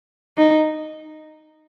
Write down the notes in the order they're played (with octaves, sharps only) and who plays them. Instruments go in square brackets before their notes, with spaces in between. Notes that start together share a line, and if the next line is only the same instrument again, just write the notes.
[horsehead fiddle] D#4